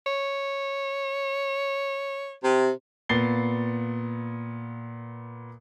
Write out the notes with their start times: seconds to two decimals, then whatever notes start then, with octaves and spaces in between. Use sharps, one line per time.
0.06 C#5
2.42 C3
3.09 A#2 B3 A6 C7 G7